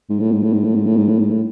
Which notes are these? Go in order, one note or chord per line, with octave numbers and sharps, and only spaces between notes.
G#2
A2
G#2
A2
G#2
A2
G#2
A2
G#2
A2
G#2
A2